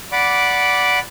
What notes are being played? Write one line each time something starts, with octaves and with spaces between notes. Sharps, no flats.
D5 F#5 B5 D6